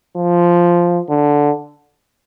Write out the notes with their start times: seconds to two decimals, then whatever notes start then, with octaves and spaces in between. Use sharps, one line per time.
0.16 F3
1.09 D3